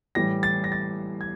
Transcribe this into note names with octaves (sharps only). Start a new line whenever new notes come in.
A2 E3 G3 A#6
A6
A#6
A6
G#6